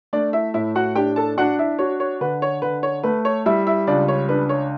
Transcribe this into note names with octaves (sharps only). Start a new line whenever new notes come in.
A3 D4 D5
E4 E5
A2 E4 E5
F#4 F#5
D4 G4 G5
A4 A5
D4 F#4 F#5
E4 E5
F#4 C#5
C#5
D3 B4
C#5
D3 B4
C#5
A3 B4
C#5
G3 E4 E5
E4 E5
C#2 D4 D5
C#5
D4 B4
C#5